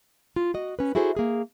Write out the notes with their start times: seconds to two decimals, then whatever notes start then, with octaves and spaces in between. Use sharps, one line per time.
0.36 F4
0.54 F#4 D#5
0.79 C#4 B4
0.95 E4 F#4 G#4 A4 C5
1.17 A#3 G#4